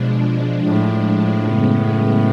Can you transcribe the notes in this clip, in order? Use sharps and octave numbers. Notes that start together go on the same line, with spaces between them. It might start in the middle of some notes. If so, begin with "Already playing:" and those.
Already playing: B2 F3 G#3 D4
A2
F#2 C#3 G#3 B3